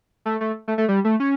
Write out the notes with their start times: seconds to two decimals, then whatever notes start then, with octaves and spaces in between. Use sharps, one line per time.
0.25 A3
0.41 A3
0.68 A3
0.78 A3
0.88 G3
1.05 A3
1.20 C#4